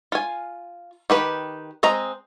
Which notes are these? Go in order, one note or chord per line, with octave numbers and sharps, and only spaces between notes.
F4 G#5
D#3 G4 B4
G#3 C4 D#5 A#5